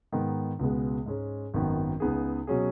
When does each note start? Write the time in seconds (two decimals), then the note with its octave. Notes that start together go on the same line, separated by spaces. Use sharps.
0.12 G#2 D#3 B3
0.59 C#2 B2 G#3 B3
1.06 G#2 G#3 C#4
1.54 G#1 F#2 D#3 B3
2.00 C#2 C#3 B3 D#4 G#4
2.47 B2 F#3 C#4 G#4